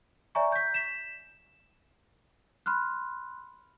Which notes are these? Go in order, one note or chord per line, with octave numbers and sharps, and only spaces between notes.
C#5 D5 E5 G#5 A#5 C#6
G6 B6
B6 E7
B5 C6 F6 F#6